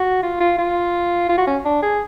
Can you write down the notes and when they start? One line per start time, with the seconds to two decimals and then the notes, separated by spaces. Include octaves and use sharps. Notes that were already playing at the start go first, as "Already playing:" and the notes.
Already playing: F#4
0.23 F4
0.40 F4
0.58 F4
1.29 F4
1.37 F#4
1.47 C#4
1.65 D4
1.83 G#4